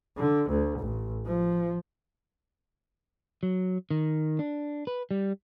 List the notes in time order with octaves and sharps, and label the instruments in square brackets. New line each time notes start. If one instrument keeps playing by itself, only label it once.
[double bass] D3
D2
A1
F3
[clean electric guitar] F#3
D#3
D4
B4
G3